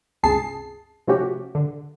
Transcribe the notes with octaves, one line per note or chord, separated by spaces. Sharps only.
G1 C#2 C3 G#4 A5 C7
C3 F3 A3 C#4 F#4 G4
D3